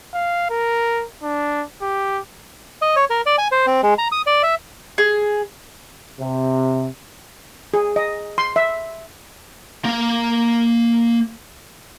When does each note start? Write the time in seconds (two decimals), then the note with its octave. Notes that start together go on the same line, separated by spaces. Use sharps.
0.13 F5
0.50 A#4
1.22 D4
1.82 G4
2.82 D#5
2.96 C#5
3.10 A#4
3.26 D5
3.38 G#5
3.52 C5
3.67 C4
3.83 G#3
3.98 A#5
4.12 D#6
4.26 D5
4.43 E5
4.98 G#4
6.19 C3
7.74 G#4
7.96 D#5
8.38 C6
8.56 E5
9.85 A#3 F5